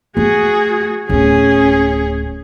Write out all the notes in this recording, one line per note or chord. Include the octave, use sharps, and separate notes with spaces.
A3 F#4 G#4
D1 A3 C#4 G#4